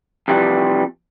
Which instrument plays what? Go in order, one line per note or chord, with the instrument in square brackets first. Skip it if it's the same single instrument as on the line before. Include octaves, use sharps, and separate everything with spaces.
[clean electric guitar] F2 C3 E3 G3